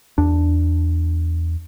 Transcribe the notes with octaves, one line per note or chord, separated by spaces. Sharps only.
E2 D4